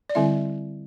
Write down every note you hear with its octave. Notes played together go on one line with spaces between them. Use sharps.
D5
D3 G3 C4 E4 E5